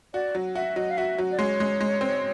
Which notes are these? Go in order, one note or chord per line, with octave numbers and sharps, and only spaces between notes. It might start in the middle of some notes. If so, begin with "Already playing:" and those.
F#4 D5
F#3
F#4 E5
F#3 D#5
F5
F#4 E5
F#3
D5
G#3 C#5
G#3
G#3
C4